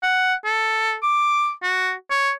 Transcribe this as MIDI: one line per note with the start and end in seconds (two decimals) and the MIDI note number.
0.03 0.34 78
0.45 0.95 69
1.03 1.51 86
1.63 1.92 66
2.11 2.31 73